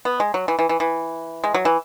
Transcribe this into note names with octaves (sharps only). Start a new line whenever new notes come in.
B3
G#3
F#3
E3
E3
E3
E3
G#3
F#3
E3